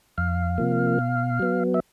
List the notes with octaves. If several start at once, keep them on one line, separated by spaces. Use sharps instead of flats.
F2 F5
C3 F3 A#3
B2
F#3 B3
E5